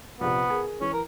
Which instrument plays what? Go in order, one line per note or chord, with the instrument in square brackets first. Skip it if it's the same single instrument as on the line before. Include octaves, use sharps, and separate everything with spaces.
[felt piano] A#1 C3 [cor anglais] B3
[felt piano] G#4 A#4
[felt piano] E3 [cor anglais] C#4
[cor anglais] A#4